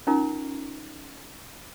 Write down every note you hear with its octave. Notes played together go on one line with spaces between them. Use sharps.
C#4 D#4 F4 A#4 A#5